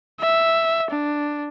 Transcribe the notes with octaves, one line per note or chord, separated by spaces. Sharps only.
E5
D4